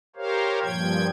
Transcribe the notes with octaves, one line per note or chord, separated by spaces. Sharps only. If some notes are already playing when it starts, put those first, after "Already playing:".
G4 A#4 C5 C#5 F5
G2 A#2 F3 G5 G#6